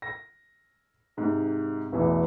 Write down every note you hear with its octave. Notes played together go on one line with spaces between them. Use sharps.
A#6
G#2 C3
A1 E2 B2 E3